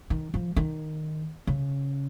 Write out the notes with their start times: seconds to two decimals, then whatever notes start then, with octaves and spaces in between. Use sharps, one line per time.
0.10 D#3
0.34 F3
0.56 D#3
1.47 C#3